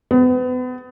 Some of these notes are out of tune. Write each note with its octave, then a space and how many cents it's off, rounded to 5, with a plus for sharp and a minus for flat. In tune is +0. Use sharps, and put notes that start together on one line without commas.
B3 +35